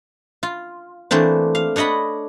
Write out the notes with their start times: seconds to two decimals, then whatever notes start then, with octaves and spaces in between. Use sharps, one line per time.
0.43 F4
1.11 E3 A3 A#3 C4 D4
1.55 F5
1.76 D4 C#5 D#5 F#5 B5